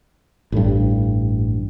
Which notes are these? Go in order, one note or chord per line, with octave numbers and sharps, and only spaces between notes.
A1 G2